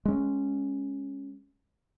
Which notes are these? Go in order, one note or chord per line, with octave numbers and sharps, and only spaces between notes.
G#3 C#4